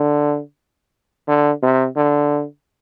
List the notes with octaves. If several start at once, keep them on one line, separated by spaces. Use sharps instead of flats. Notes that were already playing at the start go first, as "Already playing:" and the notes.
Already playing: D3
D3
C3
D3